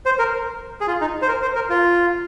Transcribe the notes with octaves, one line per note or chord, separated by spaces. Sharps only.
C5
A#4
G#4
F4
D#4
C5
A#4
C5
A#4
F4